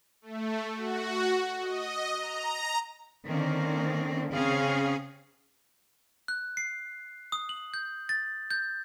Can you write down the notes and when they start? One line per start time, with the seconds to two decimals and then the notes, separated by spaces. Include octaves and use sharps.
0.22 A3
0.75 F#4
1.61 D#5
2.17 A#5
3.27 D3 D#3 A#3 C4 C#4
4.32 C#3 C4 C#4 G#4 F5
6.28 F#6
6.57 C7
7.32 D#6
7.49 F#7
7.74 G6
8.09 A6
8.51 G6